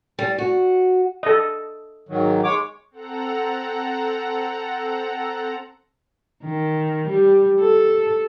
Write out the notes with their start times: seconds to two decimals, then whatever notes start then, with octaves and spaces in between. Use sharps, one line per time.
0.19 G3
0.38 F#4
1.23 A4 D#5
2.09 G#2 D#3 F#3
2.44 G#3 C#5 D6
2.91 C4 A4 F#5 A#5
6.44 D#3
7.08 G3
7.60 A4